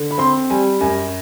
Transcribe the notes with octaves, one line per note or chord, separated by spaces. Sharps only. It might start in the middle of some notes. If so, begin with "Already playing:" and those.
Already playing: D3
B5
C4 C6
G3 G#5
F#2 G#5